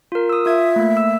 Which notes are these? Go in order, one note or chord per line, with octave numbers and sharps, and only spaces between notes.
F4 A#4
D#6 E6
F4 E5 G#6
A3 A#3
E6